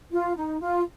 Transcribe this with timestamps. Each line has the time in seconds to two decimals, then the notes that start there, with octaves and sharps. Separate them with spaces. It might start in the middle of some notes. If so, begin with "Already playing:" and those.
0.11 F4
0.36 D#4
0.60 F4